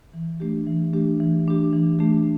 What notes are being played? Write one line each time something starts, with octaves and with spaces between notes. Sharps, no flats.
E3
A3 D4 G4
E3
A3 D4 G4
E3
A3 D4 G4
E3
A3 D4 G4